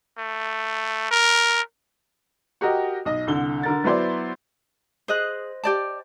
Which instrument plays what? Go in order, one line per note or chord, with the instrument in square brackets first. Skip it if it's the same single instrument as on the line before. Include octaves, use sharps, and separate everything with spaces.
[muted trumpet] A3
A#4
[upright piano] F#4 G4 A#4 D#5
B1 D#5
C2 D3 G7
D3 A#4 A6
F#3 B3 E4 C5 D5
[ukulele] G#4 [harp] C5 D#5 F#6
[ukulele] G4 D5 A5